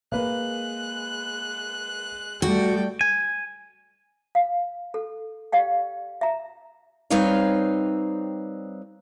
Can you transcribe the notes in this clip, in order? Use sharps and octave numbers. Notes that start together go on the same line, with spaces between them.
G#3 A#3 B4 F#6
G3 A3 F#4 D5 G5
G#5
F5
A4
G4 D5 F5 G5
E5 A#5
G3 C4 D#4 B4 C#5 F5